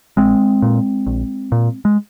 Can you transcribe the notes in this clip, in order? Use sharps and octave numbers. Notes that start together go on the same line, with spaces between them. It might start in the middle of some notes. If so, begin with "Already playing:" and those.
A#1 G#3 C4
A#2
A#1
A#2
G#3